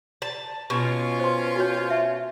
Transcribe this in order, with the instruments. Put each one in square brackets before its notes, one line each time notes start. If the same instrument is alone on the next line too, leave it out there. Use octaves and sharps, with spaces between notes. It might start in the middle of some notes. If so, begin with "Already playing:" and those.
[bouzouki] A5
[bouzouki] B2 [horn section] C#4 F4
[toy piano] C5 C6
F#4 C#5
E5